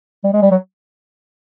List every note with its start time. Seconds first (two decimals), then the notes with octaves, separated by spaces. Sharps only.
0.24 G3
0.33 G#3
0.42 G3
0.51 F#3